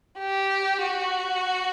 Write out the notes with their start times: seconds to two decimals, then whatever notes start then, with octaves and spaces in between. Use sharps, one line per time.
0.19 G4
0.82 F#4